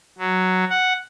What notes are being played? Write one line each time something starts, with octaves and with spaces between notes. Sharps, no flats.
F#3
F#5